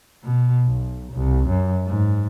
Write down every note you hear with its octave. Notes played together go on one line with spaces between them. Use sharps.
B2
B1
C2
F#2
G#2